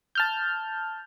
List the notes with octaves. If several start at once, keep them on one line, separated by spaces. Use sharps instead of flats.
A5 F6 G6